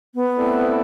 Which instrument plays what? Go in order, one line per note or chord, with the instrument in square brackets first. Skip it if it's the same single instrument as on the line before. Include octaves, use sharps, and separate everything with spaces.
[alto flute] B3
[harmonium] A3 C4 E4 A4 D5